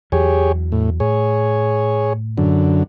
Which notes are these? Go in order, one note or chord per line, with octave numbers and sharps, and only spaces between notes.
E2 E3 F#3 G4 G#4 C#5
A2
A2 G#4 C#5
F#2 D3